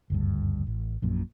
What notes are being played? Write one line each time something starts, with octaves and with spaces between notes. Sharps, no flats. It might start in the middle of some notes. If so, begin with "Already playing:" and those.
F#1 D2 G2
A1
A#1 F#2 A#2